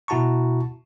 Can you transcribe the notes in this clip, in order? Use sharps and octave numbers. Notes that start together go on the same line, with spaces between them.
B2 E4 F#4 A5 A#5 C#6